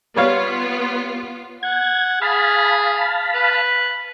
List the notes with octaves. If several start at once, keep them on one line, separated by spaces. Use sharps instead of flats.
G3 B3 F4 C#5 F5
F#5 G#6
G#4 F5 A5 B5
B4